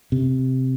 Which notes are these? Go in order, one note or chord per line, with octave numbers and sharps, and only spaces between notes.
C3